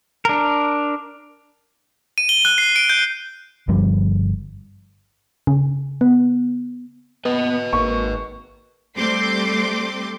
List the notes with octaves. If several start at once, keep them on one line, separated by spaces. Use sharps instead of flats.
D4 A#4
D#7
G7
F#6
C7
D7
G6
G1 G2 F3 G3
C#3
B3
B3 B4 D#5
G#1 A#3 C#6
G3 A3 C4 C6 D6